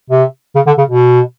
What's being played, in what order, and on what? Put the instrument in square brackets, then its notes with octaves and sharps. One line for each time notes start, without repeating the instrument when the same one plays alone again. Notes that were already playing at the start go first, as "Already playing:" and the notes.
[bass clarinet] C3
C#3
D3
C#3
B2